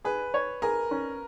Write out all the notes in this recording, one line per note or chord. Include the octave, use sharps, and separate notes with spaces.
G#4 B4
C#5
G#4 A#4
C#4